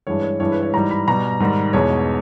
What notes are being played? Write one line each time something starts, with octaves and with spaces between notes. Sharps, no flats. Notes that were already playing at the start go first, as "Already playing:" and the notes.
G2 E3 G#3 C#5
C#5
G2 E3 G#3 C#5
B4
C#5
G#2 E3 G3 A#5
B5
B2 G3 A#5
G#2 D#3 G3
E2 B2 G#3 C#5